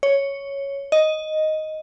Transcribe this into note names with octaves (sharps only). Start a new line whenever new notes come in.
C#5
D#5